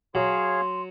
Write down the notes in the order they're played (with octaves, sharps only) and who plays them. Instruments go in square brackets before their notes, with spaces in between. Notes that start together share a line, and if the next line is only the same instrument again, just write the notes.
[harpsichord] F#3 [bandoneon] G#4 C#5 F5 [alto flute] C6